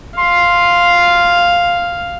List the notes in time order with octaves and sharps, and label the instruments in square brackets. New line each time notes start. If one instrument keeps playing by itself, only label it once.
[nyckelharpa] F5 [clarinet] C6